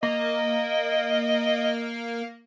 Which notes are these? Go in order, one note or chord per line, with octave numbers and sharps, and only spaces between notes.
A#3 D#5